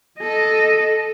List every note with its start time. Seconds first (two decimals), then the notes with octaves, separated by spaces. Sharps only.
0.20 A4 D#5